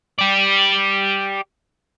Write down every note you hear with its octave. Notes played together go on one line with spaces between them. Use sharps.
G4 D5